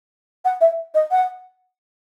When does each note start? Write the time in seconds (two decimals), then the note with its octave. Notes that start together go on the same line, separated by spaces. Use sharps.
0.45 F#5
0.61 E5
0.95 D#5
1.11 F#5